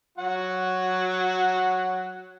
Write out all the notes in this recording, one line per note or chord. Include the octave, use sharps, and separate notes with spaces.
F#3 F#4 F#5